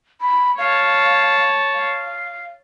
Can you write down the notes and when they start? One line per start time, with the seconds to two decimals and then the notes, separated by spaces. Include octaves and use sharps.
0.21 B5
0.58 C#5 F5 A5
1.75 F5